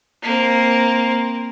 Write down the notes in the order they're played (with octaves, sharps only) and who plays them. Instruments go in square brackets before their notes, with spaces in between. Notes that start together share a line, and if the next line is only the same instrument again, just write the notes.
[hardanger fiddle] A#3 C4